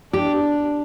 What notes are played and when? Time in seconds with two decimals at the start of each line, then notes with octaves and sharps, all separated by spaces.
0.13 D4 G4